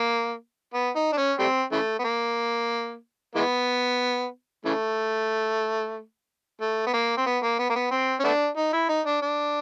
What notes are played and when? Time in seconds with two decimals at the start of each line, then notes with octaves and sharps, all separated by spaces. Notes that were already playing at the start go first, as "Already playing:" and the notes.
Already playing: A#3
0.74 B3
0.96 D#4
1.13 D4
1.17 C#4
1.39 G3 A3 C4
1.72 C#3 E3 A3
1.99 B3
2.05 A#3
3.35 E3 G#3 B3
4.65 C#3 E3 A3
6.61 A3
6.87 B3
6.94 A#3
7.18 C4
7.26 B3
7.43 A#3
7.59 B3
7.70 A#3
7.76 B3
7.92 C4
8.20 C#4
8.24 A3 B3 D4
8.57 D#4
8.73 E4
8.89 D#4
9.06 D4
9.22 D4